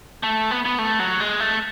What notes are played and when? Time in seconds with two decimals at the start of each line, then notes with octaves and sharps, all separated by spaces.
0.23 A3
0.51 B3
0.65 B3
0.79 A3
0.99 F#3
1.20 G#3
1.40 A3